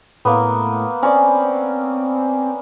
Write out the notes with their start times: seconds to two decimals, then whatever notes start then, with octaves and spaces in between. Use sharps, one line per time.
0.25 A2 A#3 B3
1.03 C4 C#4 D5